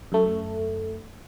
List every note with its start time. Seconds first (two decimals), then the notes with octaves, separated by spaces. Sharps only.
0.12 F#2 A3